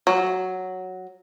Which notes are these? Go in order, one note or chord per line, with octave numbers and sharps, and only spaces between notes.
F#3